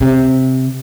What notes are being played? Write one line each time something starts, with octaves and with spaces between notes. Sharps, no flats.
C3